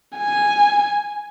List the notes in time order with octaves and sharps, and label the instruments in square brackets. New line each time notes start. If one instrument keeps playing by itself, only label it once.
[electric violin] G#5